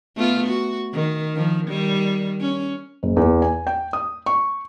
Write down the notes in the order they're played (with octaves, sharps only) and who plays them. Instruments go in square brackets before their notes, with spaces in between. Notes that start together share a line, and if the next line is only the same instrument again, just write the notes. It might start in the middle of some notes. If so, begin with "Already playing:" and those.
[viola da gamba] A3 B3 F4
F#4
D#3
D#3 F3
D#3 G3
C#4
[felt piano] F#1
E2
G#5
G5
D#6
C#6